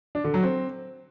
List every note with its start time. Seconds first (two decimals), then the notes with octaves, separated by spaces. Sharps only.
0.15 D4
0.24 D3
0.34 F#3
0.43 C4